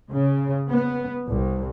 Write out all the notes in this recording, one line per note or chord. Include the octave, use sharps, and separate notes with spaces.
C#3
B3
C2